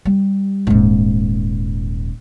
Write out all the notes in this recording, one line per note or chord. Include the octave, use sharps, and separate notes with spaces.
G3
D#1 G#2